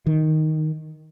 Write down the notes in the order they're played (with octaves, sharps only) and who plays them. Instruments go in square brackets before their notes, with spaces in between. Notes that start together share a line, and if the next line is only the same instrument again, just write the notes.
[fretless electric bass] D#3